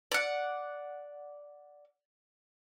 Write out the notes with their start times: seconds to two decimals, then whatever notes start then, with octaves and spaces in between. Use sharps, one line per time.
0.12 D5 F#5